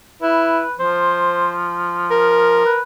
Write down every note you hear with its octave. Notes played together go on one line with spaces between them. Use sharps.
E4 B4
F3 C5
A#4
B4